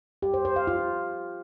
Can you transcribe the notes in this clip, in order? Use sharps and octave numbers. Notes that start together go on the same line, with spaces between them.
G4
C5
C5
F5
F4